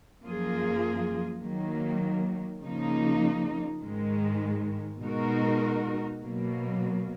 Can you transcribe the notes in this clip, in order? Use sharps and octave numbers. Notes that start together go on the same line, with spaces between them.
F#2 F3 A#3 F4 G#4
D#3 F#3 A#3
C#3 F3 A#3 D#4
G#2 D#3 G#3
B2 G#3 D#4 F#4 A#4
B2 F#3 A#3